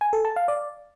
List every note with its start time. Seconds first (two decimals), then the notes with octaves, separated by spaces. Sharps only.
0.01 G#5
0.13 A4
0.25 A5
0.36 F5
0.48 D5